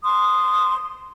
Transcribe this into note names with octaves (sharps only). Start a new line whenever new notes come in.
C6 D#6